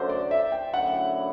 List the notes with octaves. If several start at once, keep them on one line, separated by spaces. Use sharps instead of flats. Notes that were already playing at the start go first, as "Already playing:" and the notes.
Already playing: F#2 D3 F#3 A3 C5
D5
E5
G5
F#2 D3 A3 E4 F#5